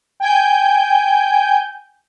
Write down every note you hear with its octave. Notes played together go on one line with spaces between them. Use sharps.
G5 G#5 G6